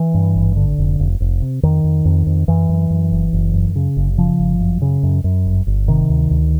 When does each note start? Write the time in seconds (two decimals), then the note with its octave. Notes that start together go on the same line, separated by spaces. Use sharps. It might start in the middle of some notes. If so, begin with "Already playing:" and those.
Already playing: E3
0.14 G2
0.35 G#1
0.57 D3
0.78 F1
0.99 F1
1.20 F1
1.42 C3
1.63 F2 D#3
1.84 F2
2.05 F2
2.26 F2
2.48 F#2 E3
2.69 F#2
2.90 F#2
3.12 F#1
3.33 F#1
3.54 F#2
3.76 C#3
3.97 F#1
4.18 C#3 F3
4.39 G1
4.60 F#2
4.82 C#3
5.03 F#2
5.24 F#2
5.45 G1
5.67 G1
5.88 C3 D#3
6.09 D2
6.31 D2